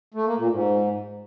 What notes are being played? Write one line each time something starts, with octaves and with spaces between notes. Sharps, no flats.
A3
A#3
A#2
G#2